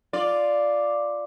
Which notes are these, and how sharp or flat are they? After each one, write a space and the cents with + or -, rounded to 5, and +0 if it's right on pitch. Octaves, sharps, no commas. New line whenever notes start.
F4 +0 D5 +0